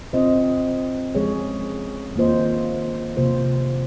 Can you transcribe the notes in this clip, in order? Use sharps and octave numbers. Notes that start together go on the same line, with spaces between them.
C4 F4 C5 D#5
F3 G#3 C#4 G#4 C#5
D#3 A#3 F4 C5 D#5
C3 F3 A#3 F4 C5